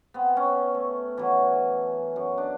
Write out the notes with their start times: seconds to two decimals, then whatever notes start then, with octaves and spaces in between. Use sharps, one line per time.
0.14 B3 C4
0.37 C#4
0.74 A3
1.17 E3 F#3
2.16 F#2
2.38 D4